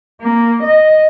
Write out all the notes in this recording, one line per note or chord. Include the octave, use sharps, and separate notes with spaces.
A#3
D#5